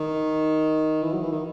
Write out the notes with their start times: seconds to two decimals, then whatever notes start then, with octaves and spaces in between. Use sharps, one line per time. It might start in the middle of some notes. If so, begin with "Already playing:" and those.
Already playing: D#3
1.02 E3
1.12 F#3
1.22 E3
1.32 D#3